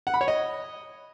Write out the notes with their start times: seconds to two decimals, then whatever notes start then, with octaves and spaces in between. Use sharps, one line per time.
0.07 F#5
0.14 B5
0.21 C#5
0.28 D#5